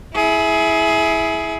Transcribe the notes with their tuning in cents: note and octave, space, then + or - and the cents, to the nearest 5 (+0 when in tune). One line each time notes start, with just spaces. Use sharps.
E4 -5 G#4 +20